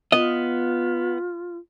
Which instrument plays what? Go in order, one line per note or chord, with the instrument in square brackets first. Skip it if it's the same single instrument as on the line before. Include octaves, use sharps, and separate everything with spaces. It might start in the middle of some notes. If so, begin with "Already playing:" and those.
[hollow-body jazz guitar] B3 D#5 [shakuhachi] F4